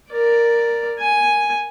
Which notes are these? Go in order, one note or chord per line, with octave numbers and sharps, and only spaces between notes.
A#4 D5
G#5